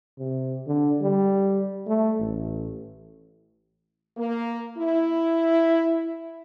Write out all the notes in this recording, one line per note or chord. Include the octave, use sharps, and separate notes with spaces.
C3
D3
G3
A3
A1
A#3
E4